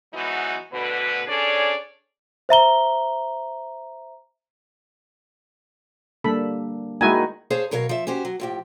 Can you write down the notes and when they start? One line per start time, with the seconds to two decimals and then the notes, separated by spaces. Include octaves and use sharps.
0.14 G#2 E3 F#3 B3 D#4 F#4
0.72 D2 B2 D3 B4
1.27 C#4 D4 G#4 A4 C#5 D5
2.49 C5 E5 A#5 G7
6.24 G3 A#3 D4 A4 B5
7.01 D#3 G#3 A#3 E4 F#4 G#5
7.50 G#4 C5 C#5 F5 A5
7.71 B2 F#3 A#4 C#5 F5
7.89 F3 E5
8.07 C#4 F#4 G4 C5
8.25 F#3
8.40 A2 F3 G4